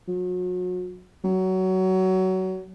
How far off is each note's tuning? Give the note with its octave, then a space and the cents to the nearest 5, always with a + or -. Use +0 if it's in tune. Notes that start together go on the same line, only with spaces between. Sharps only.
F#3 -35
F#3 +20